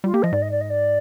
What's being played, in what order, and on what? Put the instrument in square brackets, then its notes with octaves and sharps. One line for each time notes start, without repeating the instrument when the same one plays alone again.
[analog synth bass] G3 [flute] F4
[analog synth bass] A#3 [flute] G4
[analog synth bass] F3 [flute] D#5
[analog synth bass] G#2 [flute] D5
[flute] D#5
D5
D#5
D5